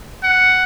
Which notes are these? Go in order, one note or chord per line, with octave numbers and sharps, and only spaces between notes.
F#5